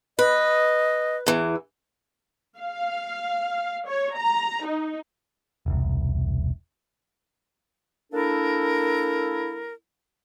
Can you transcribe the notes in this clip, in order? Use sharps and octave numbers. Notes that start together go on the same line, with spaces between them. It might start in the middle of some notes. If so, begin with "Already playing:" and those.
B4 D#5
E2 E3
F5
C#5
A#5
D#4
E1 C2
A#3 D4 E4 A4 A#4